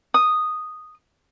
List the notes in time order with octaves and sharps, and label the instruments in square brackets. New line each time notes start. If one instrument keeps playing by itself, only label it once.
[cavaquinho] D#6